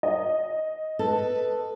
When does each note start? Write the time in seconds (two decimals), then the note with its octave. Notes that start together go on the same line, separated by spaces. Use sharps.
0.03 D#5
0.99 A4 B4